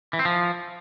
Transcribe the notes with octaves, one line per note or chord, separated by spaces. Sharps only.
E3
C4
F3